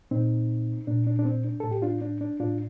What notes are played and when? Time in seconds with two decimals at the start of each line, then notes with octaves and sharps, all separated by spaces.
0.11 A#2 C4 D#4
0.87 A#2 D4
1.07 D4
1.19 D4
1.25 C4
1.45 D4
1.60 A2 A4
1.71 G4
1.82 D4 F4
2.01 D4
2.21 D4
2.40 A2 D4 F4